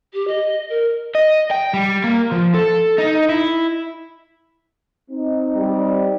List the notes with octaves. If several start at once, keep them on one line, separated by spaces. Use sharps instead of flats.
G4
D#5
A#4
D#5
G5
G3
A#3
F3
A4
D#4
E4
C4 D#4
G3